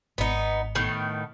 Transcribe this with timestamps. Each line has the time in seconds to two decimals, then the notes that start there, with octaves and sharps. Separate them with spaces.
0.18 G#1 B3 D#4
0.75 A2 D#3 B3